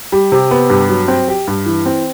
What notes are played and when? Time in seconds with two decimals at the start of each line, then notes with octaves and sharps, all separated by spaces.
0.12 G3
0.32 C3
0.51 B3
0.70 G2
0.89 F#3
1.08 C4
1.28 G4
1.47 G2
1.66 E3
1.86 C4